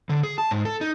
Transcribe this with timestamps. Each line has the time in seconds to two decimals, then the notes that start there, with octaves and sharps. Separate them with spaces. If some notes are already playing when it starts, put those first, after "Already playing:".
0.09 D3
0.23 G#4
0.38 A5
0.51 G#2
0.65 A4
0.81 D#4